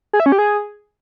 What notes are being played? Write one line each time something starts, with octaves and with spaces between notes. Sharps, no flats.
G#4
E5
C#4
G4
G#4